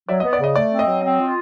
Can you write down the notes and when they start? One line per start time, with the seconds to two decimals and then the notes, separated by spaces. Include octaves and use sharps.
0.09 F#3 D5 E5
0.20 B3 D#5
0.33 D5
0.40 C#3 D#5
0.56 A3 D5
0.72 C4
0.79 D#5
0.87 F#3
1.03 C4
1.19 F4